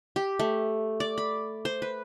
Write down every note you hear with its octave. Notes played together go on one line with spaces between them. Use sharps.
G4
A3
D5
B5
C5
B4